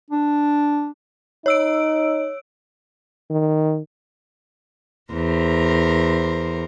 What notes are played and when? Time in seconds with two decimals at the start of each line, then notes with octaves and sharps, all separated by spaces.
0.10 D4
1.46 D#4 C#5 E6 D7
3.30 D#3
5.13 E2 A#4 C5